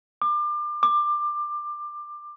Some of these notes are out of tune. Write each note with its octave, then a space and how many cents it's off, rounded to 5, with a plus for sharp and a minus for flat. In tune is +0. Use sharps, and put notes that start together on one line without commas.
D6 +30
D6 +20